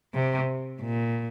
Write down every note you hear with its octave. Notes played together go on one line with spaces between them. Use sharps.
C3
A#2